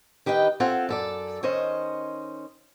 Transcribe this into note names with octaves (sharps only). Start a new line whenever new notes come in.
D#3 G4 B4 D#5 G5
C4 F4 A4 F#5 G#5
F#2 A4 D5
D#3 C#4 C5 D#5